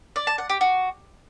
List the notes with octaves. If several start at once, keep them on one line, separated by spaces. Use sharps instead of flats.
D5
A5
F#5
G4
F#4